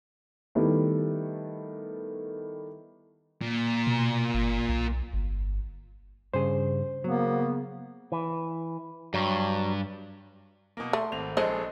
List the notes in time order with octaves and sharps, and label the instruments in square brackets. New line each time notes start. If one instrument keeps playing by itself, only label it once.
[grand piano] D#3 G3 A3 B3 E4
[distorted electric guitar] A#2
[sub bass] B2
G1
B1
G1
[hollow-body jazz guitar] G2 C#3 G#4 [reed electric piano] C5
[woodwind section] C#3 B3 [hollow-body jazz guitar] F#3 [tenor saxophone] A#3
[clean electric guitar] E3
[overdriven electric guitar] G2 [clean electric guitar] F#3
[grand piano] B2 A#3
[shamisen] A3 [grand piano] C6
[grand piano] G#1 C4 F7
[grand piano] A#1 G#4 A4 [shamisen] G#3 C5 D#5